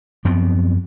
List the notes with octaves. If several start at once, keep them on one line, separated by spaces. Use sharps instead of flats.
F#2 F3 B3 C4